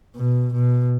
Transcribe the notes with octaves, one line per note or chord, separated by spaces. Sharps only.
B2
B2